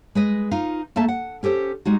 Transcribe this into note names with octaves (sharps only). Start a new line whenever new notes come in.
G#3 B4 D#5
D#4 F4 F5
A3 A#3 A4 E5 A5
F#5
C#4 G4 A4 C5
G3 G#3 D#4 F#4